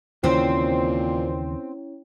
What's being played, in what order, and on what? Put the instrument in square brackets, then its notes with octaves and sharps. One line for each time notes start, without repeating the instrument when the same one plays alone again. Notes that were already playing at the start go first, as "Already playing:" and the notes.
[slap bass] D#2 C#3 E3 [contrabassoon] A#2 [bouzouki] C4 [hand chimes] C#4 E4 C#5